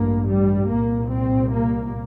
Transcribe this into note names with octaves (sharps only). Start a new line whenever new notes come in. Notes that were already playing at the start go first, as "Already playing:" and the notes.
Already playing: A1 G2 A#3
G3
C2 A#2 A#3
C4
A#3